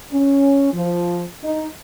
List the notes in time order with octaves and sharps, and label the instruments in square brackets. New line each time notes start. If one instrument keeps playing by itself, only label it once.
[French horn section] C#4
F3
D#4